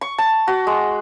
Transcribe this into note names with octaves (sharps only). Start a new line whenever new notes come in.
C#6
A5
F#4
G#3